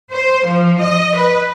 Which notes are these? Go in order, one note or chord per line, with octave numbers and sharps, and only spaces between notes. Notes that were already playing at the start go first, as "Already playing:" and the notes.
C5
F3
D#5
B4